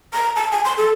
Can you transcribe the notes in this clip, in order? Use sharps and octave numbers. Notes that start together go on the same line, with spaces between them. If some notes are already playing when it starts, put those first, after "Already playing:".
A#5
A5
G#5
C6
A4